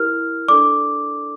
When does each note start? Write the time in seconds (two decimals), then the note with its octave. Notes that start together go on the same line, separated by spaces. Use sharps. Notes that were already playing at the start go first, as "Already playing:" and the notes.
Already playing: E4 G4 A#4 F6
0.48 D4 A4 D5 D6